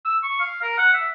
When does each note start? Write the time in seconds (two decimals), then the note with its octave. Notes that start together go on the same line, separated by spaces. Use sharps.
0.05 E6
0.23 C#6
0.40 F5
0.62 A#4
0.78 F#5
0.94 E5